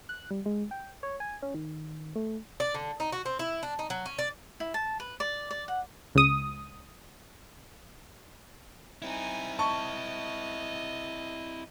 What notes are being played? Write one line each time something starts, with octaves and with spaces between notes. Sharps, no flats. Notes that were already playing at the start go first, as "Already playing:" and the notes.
F#6
G3
G#3
G5
C#5
G#5
C#4
D#3
A3
D5
D3
D#4
F#4
C4
E4
D4
D#4
F#3
C#4
D5
E4
A5
B4
D5
D5
F#5
C#2 D#6
C4 D#4 E4 G#5
D#5 A5 C#6